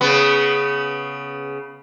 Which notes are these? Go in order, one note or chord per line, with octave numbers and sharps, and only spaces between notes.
C#3 B3